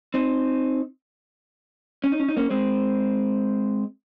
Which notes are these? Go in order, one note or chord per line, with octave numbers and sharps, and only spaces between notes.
C4 D#4
C#4
D#4
C#4
D#4
A#3 C#4
G#3 C4